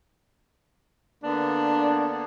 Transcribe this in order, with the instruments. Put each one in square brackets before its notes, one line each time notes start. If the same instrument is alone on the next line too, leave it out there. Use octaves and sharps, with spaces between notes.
[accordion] D3 A#3 B3 [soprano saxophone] D4